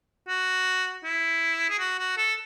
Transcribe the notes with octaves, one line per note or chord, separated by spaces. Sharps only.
F#4
E4
G#4
F#4
F#4
A4